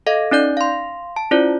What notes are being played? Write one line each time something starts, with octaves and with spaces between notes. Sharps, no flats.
A4 D#5 F5
C#4 D#4 D5 G6
F5 C6
A5
C#4 E4 F4 C5 D5